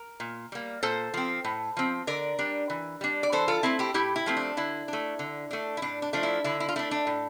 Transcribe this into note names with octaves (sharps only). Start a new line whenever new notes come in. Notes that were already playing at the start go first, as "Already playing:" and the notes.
Already playing: A#4
A#2
G3 A#3
A#2 A4 C5
F3 C4
A2
F3 C4
D3 A#4 D5
G3 D4
E3
G3 D4
D5
E3 A4 C5
F4 A4
A3 C4 E4
E4 G4
A2 E4 G4
E4
F3 A3 C4
D4
D3 E4
A3 D4
D3
A3 D4
E4
A2 D4
D4
F3 A3 D4
E4
D3 E4
E4
F4
A3 D4 E4
D4
A2